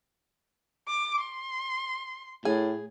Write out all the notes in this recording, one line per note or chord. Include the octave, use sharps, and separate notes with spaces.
D6
C6
A2 G#4